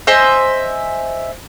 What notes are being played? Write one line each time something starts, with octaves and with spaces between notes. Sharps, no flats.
C5 D#5 E5 G#5